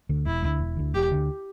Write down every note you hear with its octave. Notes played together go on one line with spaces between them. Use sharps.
D2 D3
E1 E4
D2 D3
E1
D2 D3
E1 G4
D2 D3